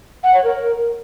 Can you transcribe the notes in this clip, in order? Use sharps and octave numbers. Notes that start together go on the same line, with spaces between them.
F#5
C#5
A#4